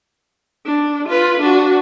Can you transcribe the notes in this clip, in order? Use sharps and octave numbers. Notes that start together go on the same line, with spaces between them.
D4
F4 B4
D4 F#4